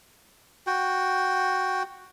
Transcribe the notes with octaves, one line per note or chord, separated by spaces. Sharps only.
F#4 G5